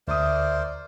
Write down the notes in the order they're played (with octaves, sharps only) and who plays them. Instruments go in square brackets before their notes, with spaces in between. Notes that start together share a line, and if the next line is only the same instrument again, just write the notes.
[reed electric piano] D2 D#6 [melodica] A#4 C5 D5 [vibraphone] E5